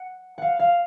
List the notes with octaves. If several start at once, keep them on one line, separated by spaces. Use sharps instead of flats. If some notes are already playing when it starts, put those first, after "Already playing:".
Already playing: F#5
F5 F#5
F5